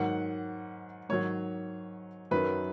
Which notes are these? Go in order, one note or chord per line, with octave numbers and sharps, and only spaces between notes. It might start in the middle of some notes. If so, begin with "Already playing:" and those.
Already playing: G#2 D#3 F#3 F#5
G#2 D#3 F#3 C#5
F#2 D#3 F#3 B4